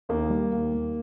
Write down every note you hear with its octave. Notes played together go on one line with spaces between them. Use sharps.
D#2 A#3
G3
D#2
D#2